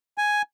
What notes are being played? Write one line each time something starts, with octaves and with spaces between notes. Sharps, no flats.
G#5